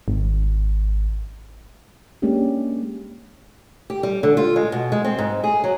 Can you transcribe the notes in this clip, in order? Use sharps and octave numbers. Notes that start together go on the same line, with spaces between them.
G#1
G#3 A#3 C#4 D4 G4
G4
G3
D3
F4
G#3
B2
G#3
C4
G#2
G#4
F#3